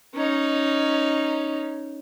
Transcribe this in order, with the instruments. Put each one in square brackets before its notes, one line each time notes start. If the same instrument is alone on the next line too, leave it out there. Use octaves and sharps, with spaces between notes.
[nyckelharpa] C#4 D#4